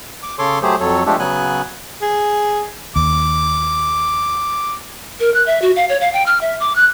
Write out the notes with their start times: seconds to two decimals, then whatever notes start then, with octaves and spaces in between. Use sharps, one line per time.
0.23 D6
0.39 C#3 A4 C#5 C6 D6
0.62 F#3 A3 G4 G#4 C5
0.80 F2 F#3 A4 C#5
1.06 F3 G#3 A3 D4 G4 A4
1.19 C#3 F#3 B3 G#5 F#6
2.02 G#4
2.96 D#2 D6
5.20 A#4
5.34 F#6
5.47 E5
5.62 F#4
5.76 F5
5.89 C#5
6.01 F5
6.13 G5
6.26 F6
6.41 E5
6.60 D6
6.76 F#6